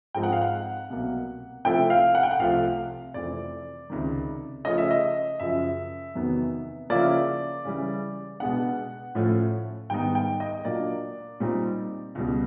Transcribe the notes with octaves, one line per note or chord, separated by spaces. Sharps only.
G#2 F3 G#3 C4 D#4 G5
F#5
F5
F#5
C2 B2 F#3 A#3
C3 F3 A3 C4 E4 G5
F5
F#5
G5
F#5
C2 C3 F3 A3 F5
F2 C3 E3 A3 C4 D5
C#2 C3 D#3
C#3 F3 A3 C#4 D#5
E5
D#5
F#2 C#3 F3 E5
E2 C3 D#3 F#3 B3
C#3 F3 A#3 C#4 E4 D5
C#3 E3 G3
B2 G#3 B3 D4 F#5
A2 F3 A3 C#4
G#2 D#3 G3 B3 D#4 G5
G5
D#5
A#2 F#3 A#3 D4 D5
A#2 G3 C4 D#4
C#2 B2 G3